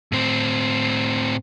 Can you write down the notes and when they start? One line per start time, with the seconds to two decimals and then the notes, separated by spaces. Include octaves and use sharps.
0.12 A2 C4